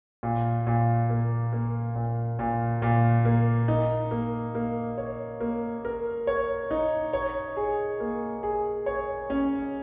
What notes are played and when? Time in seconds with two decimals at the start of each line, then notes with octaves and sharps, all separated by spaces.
0.23 A#2
0.67 A#2
1.10 A#3
1.53 A#3
1.96 A#2
2.39 A#2
2.82 A#2
3.25 A#3
3.68 D#4
4.11 A#3
4.55 A#3
4.98 C#5
5.41 A#3
5.85 A#4
6.27 C#5
6.71 D#4
7.13 C#5
7.57 G#4
8.00 A#3
8.43 G#4
8.86 C#5
9.30 C#4